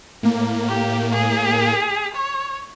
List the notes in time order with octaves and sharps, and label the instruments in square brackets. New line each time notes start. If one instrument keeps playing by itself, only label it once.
[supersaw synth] A2 A#3
[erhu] G4
G#4
C#5